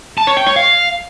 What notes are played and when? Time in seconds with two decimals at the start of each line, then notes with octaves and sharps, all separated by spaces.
0.18 A5
0.27 C#5
0.37 G5
0.46 C#5
0.56 F5